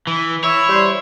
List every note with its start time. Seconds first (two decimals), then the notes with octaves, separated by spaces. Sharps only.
0.07 E3
0.44 E4 C#5
0.68 G3 C5